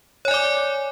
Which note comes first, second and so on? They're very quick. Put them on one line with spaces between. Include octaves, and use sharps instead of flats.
C#5 G#5 D5 D6